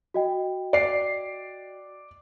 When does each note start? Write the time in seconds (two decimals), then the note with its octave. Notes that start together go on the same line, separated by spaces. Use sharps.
0.14 F#4 D#5 G5
0.73 D5 C7